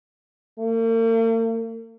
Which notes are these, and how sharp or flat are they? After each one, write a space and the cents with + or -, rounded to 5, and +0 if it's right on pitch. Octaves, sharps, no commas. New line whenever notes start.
A#3 -45